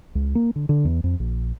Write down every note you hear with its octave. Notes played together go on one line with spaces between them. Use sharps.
C#2
A#3
D3
D3
E2
F2
A#1